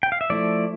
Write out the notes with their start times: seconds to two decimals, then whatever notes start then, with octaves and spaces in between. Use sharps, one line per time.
0.03 G5
0.12 F5
0.21 E5
0.30 F3 A3 E4 D5